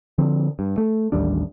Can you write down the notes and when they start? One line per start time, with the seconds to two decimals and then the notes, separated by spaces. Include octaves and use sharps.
0.18 D3 F3 C4
0.59 G2
0.78 A3
1.12 A1 D#2 G3 D4